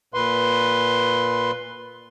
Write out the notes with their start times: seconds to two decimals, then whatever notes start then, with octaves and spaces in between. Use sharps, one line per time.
0.14 A#2 B4 C6